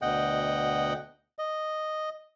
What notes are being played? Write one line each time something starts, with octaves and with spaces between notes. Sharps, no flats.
D2 B2 D#5 F#5 G5
D#5